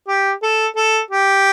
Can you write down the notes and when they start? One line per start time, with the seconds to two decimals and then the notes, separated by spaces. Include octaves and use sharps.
0.08 G4
0.42 A4
0.76 A4
1.10 G4